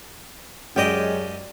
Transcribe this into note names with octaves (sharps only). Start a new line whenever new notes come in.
F#2 F#3 G#3 C#4 G4 D5 D#5 G5